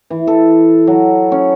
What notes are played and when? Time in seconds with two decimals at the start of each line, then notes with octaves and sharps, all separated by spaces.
0.10 E3
0.27 A4
0.87 F#3
1.32 C#4